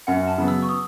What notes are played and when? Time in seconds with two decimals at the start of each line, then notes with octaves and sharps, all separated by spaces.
0.07 F#2 F#5
0.28 A5
0.38 C#3 F#3 B3
0.48 E6
0.62 C#6
0.69 D#6